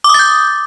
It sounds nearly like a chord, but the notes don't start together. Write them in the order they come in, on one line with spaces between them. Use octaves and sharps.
D6 D#6 A6 G6